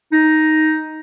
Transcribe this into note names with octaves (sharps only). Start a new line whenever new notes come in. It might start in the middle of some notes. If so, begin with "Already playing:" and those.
D#4